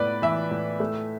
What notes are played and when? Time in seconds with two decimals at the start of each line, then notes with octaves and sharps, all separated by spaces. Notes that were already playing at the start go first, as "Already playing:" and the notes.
Already playing: A2 B3 B4 D5
0.22 E3 E5
0.51 A2
0.80 A3